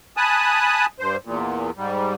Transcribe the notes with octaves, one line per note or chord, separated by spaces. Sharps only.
G#5 A5 B5 D#6 F#6
G2 C5
E2 A#2
G#2 G3